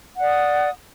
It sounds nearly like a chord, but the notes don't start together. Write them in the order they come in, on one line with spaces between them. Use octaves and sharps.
F#5 D5 D#6